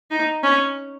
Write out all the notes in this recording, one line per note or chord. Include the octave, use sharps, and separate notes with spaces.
D#4
C#4